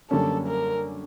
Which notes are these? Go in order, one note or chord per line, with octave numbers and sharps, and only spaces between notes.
F#2 D3 G3 A#3 C#4 A4
A#4